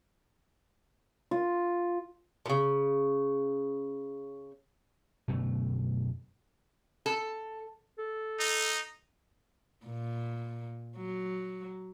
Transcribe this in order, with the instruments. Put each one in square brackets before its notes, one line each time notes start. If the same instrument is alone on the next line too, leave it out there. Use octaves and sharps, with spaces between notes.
[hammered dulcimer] F4
[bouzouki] A#2 C#3
[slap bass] F#2 B2 D3 A3
[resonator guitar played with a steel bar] A4
[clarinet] A4
[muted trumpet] D#4
[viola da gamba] A#2
F#3